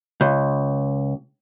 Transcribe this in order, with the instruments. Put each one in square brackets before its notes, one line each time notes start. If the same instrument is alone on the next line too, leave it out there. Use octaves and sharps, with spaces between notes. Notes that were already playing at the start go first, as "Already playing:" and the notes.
[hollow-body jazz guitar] C#2